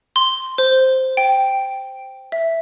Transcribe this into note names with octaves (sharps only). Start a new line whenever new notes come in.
C6
C5
G5
E5